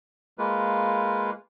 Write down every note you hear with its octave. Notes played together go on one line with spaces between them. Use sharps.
G#3 A#3 F4 B4